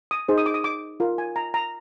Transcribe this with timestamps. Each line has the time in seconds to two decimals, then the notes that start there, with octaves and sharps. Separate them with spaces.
0.11 D#6
0.28 D#4 G#4 C5
0.38 D#6
0.46 D6
0.54 D#6
0.64 D6
1.00 F4 A#4
1.18 G#5
1.36 A#5
1.54 A#5